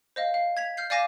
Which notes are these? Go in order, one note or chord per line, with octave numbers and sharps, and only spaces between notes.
C5 D#5 F5
F5
G#6 B6 F7
F6 G6 C7
D5 F5 G#5 D6 A#6 E7